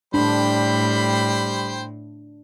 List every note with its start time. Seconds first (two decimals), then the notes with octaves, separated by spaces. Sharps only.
0.14 A2 G3 D4 C5 G5 B5